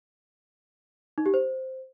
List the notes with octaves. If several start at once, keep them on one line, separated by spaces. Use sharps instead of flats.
D#4
G4
C5